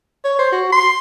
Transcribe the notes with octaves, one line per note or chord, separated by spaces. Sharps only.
C#5
C5
F#4
C6